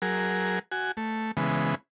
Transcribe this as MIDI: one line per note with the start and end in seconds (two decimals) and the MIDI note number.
0.02 0.59 54
0.02 0.59 68
0.02 0.59 70
0.72 0.92 66
0.72 0.92 80
0.97 1.32 57
1.37 1.75 49
1.37 1.75 52
1.37 1.75 56
1.37 1.75 59